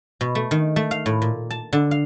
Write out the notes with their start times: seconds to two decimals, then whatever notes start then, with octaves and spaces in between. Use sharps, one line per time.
0.21 B2
0.35 A3
0.51 D#3
0.76 A3
0.91 F5
1.06 A2
1.22 A#2
1.50 A5
1.73 D3
1.91 F5